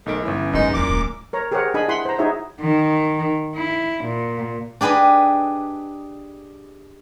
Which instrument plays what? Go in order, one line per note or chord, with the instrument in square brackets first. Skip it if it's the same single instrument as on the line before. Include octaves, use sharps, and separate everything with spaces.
[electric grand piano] B1 D7 [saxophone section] G#2 D#3 A3
[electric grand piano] G1 E4 [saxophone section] E3 C#4
[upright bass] G#1 A3 [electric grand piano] F#2 [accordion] G#3 [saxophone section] B3 D#4
[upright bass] D#2 E3 [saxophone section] A#2 [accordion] D6
[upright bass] D#1 A3
[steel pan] A#4 C#5 A#5
G4 G#4 A#4 C5 C#5 F#5
D4 G#4 D#5 G#5 B5
E4 F#5 B5 C6
C5 A#5
D#4 E4 F#4 G#4 C#5 E5
[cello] D#3
E4
A#2
[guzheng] D4 G4 G#4 B4 D#5